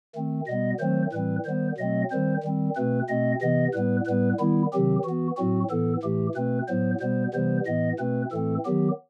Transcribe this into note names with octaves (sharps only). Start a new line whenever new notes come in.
D#3 A3 C4
B2 G3 B3 D#5
D#3 F#3 A3 C4 C5
A2 E3 G3 C4 B4
D#3 G3 B3 C5
B2 F#3 A3 C4 D#5
D#3 G3 C4 C5
D#3 G3 C4
B2 A3 C4 B4
B2 A3 C4 D#5
C3 E3 B3 D#5
A2 G3 B3 B4
A2 G3 B3 B4
D#3 G3 B3 E4
C3 D#3 F#3 C4 G4
E3 B3 F#4
A2 F#3 C4 F#4
A2 E3 B3 A4
A2 E3 A3 G4
B2 A3 C4 B4
A2 F#3 B3 C5
B2 G3 B3 C5
C3 E3 G3 B3 C5
A2 E3 B3 D#5
B2 A3 C4 B4
A2 E3 A3 C4 A4
D#3 F#3 B3 G4